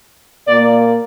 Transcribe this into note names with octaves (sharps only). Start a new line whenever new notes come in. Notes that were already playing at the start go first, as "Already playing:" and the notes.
A#2 A#3 D5